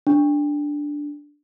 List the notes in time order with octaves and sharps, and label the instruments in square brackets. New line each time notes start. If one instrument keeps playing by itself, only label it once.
[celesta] D4